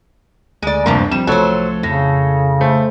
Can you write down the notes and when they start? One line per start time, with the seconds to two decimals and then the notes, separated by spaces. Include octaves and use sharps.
0.62 D2 G#3 D5
0.86 F#1 G2 C3 F3 A#3
1.11 F3 G3 C4 E7
1.27 C2 F3 F#3 A3 A4 C5 C#5
1.83 F2 A2 C#3 A#6
2.61 A3 C5